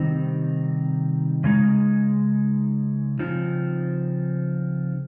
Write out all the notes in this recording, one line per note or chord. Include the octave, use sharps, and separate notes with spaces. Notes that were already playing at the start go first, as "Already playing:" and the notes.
Already playing: C3 D#3 G3 C4 D#4
C#3 G#3 D#4
C#3 F3 C4 D#4